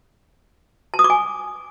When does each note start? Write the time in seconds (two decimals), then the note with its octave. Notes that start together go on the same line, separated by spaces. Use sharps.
0.94 A5
0.99 D#6
1.04 D6
1.10 G#5